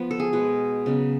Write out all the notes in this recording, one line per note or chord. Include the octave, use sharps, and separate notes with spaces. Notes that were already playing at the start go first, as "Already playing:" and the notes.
Already playing: F3 B3
A4
G#4
B2 G#3 B3
C#3 F#3 B3